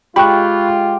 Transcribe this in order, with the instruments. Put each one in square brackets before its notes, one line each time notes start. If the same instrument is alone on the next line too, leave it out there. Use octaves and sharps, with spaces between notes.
[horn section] G#3 F4 [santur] G4 [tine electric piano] B5 C#6 F#6